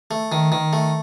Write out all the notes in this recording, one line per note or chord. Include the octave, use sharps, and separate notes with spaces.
A3
D#3
D#3
A3